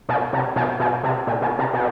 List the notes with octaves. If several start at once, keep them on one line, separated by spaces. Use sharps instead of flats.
B2
C3
B2
B2
C3
A#2
B2
C3
B2